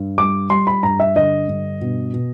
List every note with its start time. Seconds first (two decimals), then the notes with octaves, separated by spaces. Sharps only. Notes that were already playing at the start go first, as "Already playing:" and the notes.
Already playing: G2
0.17 G3 D6
0.50 G3 C6
0.67 B5
0.83 G2 A#5
1.00 E5
1.16 D3 D#5
1.48 G2
1.81 B2
2.13 B2